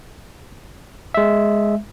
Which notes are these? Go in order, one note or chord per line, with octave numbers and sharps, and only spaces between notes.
G#3 E5